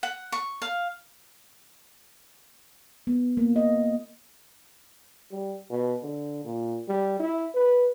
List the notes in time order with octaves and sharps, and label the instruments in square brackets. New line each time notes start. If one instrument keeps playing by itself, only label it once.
[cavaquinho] F#5
C#6
F5
[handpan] B3
A#3
D#5
[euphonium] G3
B2
D3
A#2
G3
E4
B4